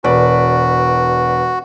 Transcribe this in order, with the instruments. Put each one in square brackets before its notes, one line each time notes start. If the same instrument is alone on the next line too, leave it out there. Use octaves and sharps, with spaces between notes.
[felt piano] E1 B4 D5 [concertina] F#4